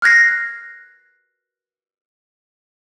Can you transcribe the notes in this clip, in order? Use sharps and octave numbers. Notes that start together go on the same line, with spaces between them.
F6 F#6 G#6 A#6 C7